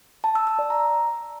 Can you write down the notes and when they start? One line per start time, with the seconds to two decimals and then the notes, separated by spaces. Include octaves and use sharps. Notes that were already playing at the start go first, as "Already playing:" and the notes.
0.24 A5
0.35 E6
0.47 E6
0.59 D5
0.70 A#5